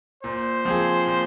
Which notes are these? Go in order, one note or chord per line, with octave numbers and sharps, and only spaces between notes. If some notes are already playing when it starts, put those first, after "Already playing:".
A#2 C5
F3 C4 G#4
A#2